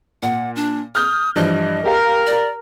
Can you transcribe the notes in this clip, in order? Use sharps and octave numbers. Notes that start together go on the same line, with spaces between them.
A#2 F#5
D4
D#6 F6 G6
G2 E3 F3 D#5
G4 A#4 F5
D5